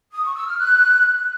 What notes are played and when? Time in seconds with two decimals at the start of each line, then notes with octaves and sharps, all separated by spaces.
0.12 D#6
0.23 C#6
0.35 E6
0.47 F6
0.58 F#6